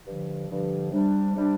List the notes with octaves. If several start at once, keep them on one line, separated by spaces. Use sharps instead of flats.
G2 D3 F3
G2 D3 F3
C3 G3 D4
C3 G3 D4